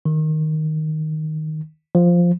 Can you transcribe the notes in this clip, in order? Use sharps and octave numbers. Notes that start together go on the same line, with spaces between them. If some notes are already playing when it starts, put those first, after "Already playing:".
D#3
F3